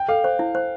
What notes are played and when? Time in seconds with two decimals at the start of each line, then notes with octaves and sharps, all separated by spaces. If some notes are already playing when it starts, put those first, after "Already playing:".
Already playing: G5
0.08 A4 F5
0.24 C5
0.39 E4
0.55 C5